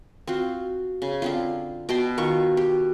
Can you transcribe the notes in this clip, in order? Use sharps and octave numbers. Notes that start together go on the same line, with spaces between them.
C4 F4 F#4
C#3
D3 C4 F4
B2 G5 A5 C6
D#3 F4 C#6
G4